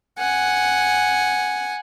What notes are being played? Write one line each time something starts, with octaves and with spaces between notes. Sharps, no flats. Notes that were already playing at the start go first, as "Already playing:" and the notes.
F#5 G#5